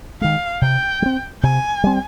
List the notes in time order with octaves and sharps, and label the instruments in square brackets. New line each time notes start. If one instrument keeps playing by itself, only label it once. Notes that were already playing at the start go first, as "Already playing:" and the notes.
[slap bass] D#3 G#3 [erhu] F5
[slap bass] C3 [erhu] G5
[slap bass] G3
C4
[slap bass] C3 [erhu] G#5
[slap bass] G3 C4